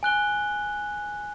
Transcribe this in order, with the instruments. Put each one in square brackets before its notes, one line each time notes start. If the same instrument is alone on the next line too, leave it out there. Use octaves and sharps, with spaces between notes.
[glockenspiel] G#5 F#6 G7